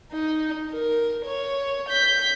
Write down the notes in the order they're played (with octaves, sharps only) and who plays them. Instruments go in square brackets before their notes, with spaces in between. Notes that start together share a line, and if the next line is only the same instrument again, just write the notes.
[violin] D#4
A#4
C#5
G6 B6